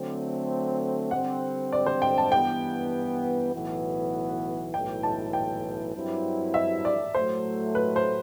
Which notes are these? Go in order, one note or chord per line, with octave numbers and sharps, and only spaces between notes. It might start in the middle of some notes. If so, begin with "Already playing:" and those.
Already playing: D3 F#3 A3 C4
D3 G3 C4 F#5
D5
C5
G5
A5
G2 E3 B3 G5
B1 A2 E3 B3 F#4
B1 A2 E3 G5
A5
G5
G2 F#3 C4 E4
E5
D5
A2 F#3 A3 C5
B4
C5